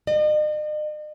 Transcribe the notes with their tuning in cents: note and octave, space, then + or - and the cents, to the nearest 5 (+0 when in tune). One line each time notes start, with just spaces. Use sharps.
D#5 -45